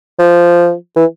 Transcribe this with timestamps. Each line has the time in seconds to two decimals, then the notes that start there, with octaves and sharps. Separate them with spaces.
0.19 F3
0.96 E3